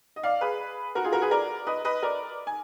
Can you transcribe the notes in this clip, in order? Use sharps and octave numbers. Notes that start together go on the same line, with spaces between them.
D#5
D5 F5
G#4 B4
F#4 A#4
F4 G#4
F#4 A#4
G#4 B4
A#4 D5
B4 D#5
B4 D#5
A#4 D5
G#5